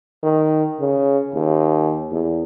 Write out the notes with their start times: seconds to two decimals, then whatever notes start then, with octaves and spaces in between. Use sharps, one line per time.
0.23 D#3
0.80 C#3
1.34 D#2
2.11 E2